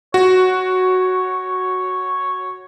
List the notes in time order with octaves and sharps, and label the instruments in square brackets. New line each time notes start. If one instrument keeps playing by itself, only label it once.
[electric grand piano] F#4 [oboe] C#5